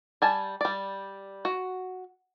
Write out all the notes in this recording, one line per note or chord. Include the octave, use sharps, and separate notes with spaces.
G3 G#5 A5
G3 D5
F#4